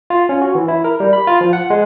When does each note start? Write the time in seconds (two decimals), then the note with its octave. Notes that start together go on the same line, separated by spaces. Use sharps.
0.10 F4
0.29 C#4
0.42 F#4
0.55 E3
0.68 E4
0.84 A#4
1.00 G3
1.13 B5
1.27 F4
1.41 F3
1.53 F#5
1.70 G#3